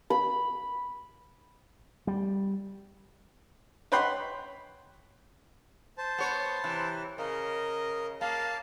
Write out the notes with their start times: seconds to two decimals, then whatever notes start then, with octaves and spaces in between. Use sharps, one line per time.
0.10 B5
2.07 G3
3.92 B4 C#5 F#5 G5 B5 C6
5.98 C5 A5
6.18 B3 C#5
6.64 C3 E3
7.18 C#3 A#4 D#5
8.21 A#3 F5 A5